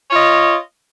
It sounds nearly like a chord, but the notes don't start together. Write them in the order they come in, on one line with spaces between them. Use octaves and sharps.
C#5 F4 D#5